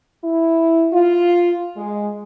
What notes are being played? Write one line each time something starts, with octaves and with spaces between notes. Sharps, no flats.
E4
F4
G#3